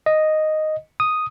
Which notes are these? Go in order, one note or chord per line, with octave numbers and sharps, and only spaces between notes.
D#5
D#6